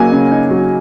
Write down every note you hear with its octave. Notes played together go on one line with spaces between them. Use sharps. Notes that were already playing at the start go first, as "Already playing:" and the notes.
Already playing: C#3 F#3 A#3 D#4 G#5
C#3
D#4
F#3